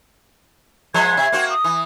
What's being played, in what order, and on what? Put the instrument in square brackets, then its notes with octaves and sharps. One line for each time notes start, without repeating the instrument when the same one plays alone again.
[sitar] F3 G#3 B3 [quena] G#6
[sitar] C3 E5
A#3 C4 F#4
[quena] D#6
[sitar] E3